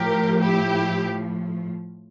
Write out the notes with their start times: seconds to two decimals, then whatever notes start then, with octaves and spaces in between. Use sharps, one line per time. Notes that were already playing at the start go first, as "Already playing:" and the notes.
Already playing: A2 F3 G4 A#4
0.41 E4 G4